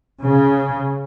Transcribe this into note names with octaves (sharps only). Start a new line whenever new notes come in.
C#3